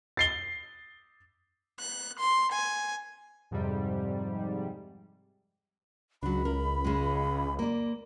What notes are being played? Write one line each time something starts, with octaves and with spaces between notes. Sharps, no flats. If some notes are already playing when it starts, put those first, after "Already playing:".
A6 C7 G7
F#6
C6
G#5
F2 G#2 C3 G3
C#2 F#3 D4 B5
A#4
C#3 G#3
A#3 D5